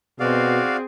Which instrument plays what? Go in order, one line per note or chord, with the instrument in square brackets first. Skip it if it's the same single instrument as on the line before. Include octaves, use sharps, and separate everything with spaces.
[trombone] B2 [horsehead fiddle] C4 G#4 [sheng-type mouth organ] F#4 D5 F5